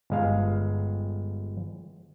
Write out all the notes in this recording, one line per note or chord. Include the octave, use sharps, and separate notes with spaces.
G1 G#3 F5